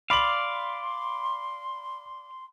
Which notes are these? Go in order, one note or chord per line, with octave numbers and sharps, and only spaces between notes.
D5 F5 B5 C6 F#7